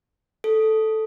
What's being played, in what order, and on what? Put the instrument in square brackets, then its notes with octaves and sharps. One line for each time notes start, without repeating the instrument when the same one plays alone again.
[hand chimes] A4